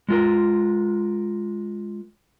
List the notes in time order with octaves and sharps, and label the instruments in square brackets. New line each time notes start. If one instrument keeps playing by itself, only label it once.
[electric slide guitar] G#3 F4 A#4